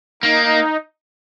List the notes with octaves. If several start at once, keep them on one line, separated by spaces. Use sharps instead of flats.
A#3 D#4